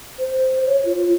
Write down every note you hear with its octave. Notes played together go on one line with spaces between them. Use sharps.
C5
C#5
F4